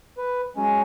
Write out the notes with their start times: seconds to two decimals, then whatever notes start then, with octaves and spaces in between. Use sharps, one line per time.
0.18 B4
0.56 F#3 G#3 C#4